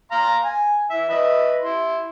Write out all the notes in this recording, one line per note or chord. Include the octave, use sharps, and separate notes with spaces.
F5 A#5 C6
G#5
E3 E5
B4 D#5 E5
E4 C6